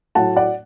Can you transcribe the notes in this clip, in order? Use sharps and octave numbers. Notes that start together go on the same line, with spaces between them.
A2 F#3 A3 F#5 A5
D5 F#5